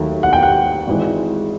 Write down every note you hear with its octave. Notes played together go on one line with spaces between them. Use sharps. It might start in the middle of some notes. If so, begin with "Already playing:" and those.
Already playing: D#2 D#3 F#3 A3
F#5
G5
F#5
G#1 G#2 E3 G#3